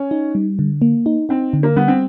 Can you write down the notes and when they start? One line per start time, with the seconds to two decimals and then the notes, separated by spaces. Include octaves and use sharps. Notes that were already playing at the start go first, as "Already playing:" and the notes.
Already playing: C#4
0.11 D#4
0.35 G3
0.59 D3
0.82 A#3
1.06 D#4
1.29 C4 D#4
1.53 D3
1.63 A#3
1.76 G3 B3
1.88 C4